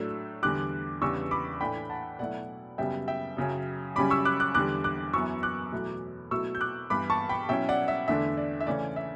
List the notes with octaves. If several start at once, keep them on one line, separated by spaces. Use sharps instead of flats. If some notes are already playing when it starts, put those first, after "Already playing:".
Already playing: A2 F#3 A3 D4 E6
E2 D3 G3 D6 F#6
E2 C#3 G3 B3 D4 C#6 E6
B5 D6
A2 E3 A3 D4 G5 B5
F#5 A5
B2 F#3 A3 E4 D5 F#5
F#2 C#3 G3 B3 E5 G5
E5 G5
F#2 C#3 F#3 C#4
F#2 C#3 G3 C#4 B5 D6
C#6 E6
D6 F#6
D6 F#6
E2 D3 G3 D6 F#6
D6 F#6
F#2 E3 B3 E4 C#6 E6
D6 F#6
E2 B2 F#3 A3 E4
B2 F#3 A3 E4 C#6 E6
G6
D6 F#6
G2 E3 B3 B5 D6
A5 C#6
G5 B5
B2 F#3 C#4 E4 E5 G5
D5 F#5
E5
E2 D3 A3 D4 E5
D5
E5
C#3 E3 A3 C#4 D5
E5